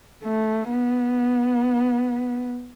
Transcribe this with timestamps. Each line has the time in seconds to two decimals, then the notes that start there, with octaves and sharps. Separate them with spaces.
0.24 A3
0.69 B3